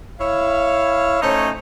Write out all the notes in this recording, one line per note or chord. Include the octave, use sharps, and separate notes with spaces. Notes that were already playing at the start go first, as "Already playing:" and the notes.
E4 C#5 F5
A3 C#4 D#4 C5 C#5